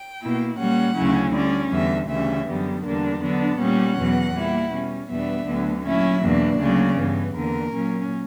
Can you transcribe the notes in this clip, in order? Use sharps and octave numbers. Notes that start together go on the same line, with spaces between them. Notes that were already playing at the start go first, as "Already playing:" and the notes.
Already playing: G5
B2 A#3 E4
A#2 G3 A#3 C#4 F#5
D2 C#3 F#3 C#4 E4
D3 G3 C#4 D5
E2 D3 G3 E5
D2 C#3 E3 G3 C#4 E5
F#2 D3 G3 B3
E2 D3 G3 A#3 D4
D3 F#3 B3 D4
A#2 G3 C#4 F#5
E2 B2 F#3
A#2 G3 A#3 E4
B2 G3 C#4
E2 B2 G3 B3 D4 E5
D2 D3 F#3 B3
A#2 F#3 C#4 E4 E5
E2 B2 A#3 D4
D2 C#3 F#3 A#3 D5
G2 E3 B3
E2 D3 A#3 A#4
A#2 F#3 C#4